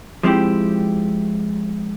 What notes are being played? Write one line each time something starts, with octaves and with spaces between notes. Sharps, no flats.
F3 G#3 C4 E4 G4